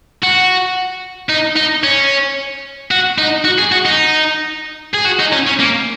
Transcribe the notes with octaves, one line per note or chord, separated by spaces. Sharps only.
F#4
D#4
D#4
C#4
F#4
D#4
F#4
G#4
F#4
D#4
G#4
F#4
D#4
C#4
C#4
A#3